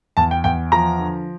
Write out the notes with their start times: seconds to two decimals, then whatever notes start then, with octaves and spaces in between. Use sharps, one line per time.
0.17 E2 A5
0.31 G5
0.44 E2 G5
0.72 F3 A#5
0.99 D3